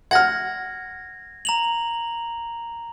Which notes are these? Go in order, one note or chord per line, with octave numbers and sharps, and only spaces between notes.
F#5 F6 G#6 A#6
A#5 F7 F#7